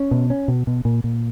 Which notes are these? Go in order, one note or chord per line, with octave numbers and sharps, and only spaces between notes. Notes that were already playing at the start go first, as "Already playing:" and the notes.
Already playing: C#4
B2
C#4
B2
B2
A#2
A#2